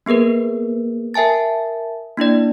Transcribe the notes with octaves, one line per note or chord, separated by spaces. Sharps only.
A#3 B3 G#4 A#4 B4
A#4 E5 G#5 A5 A6
A#3 D4 E4 D5